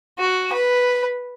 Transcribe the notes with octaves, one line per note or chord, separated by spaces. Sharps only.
F#4
B4